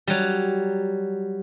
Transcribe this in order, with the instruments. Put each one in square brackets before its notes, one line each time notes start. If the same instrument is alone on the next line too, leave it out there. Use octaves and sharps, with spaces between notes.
[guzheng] F#3 G3